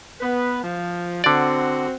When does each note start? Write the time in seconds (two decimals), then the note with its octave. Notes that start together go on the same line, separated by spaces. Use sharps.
0.20 B3 B4
0.63 F3
1.24 D3 C4 F#4 D5